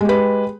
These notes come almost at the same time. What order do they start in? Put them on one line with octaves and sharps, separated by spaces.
G#3 G4 B4